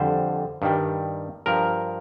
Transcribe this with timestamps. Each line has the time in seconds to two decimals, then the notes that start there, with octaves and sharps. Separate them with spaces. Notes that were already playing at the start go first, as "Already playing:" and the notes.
Already playing: F2 D3 G3 C5
0.62 G2 D#3 G3
1.46 G2 F3 A#4